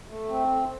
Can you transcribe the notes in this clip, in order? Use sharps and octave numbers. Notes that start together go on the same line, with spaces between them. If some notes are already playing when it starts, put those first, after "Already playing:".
A3
C4